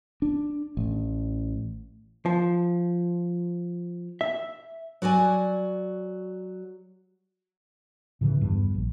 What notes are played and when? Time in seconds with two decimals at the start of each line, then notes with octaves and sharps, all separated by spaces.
0.22 D4
0.77 A1
2.26 F3
4.21 E5
5.02 F#3 F#4 D5 G#5
8.21 A2 C#3 E3
8.41 G#1 E2 G2
8.74 A#1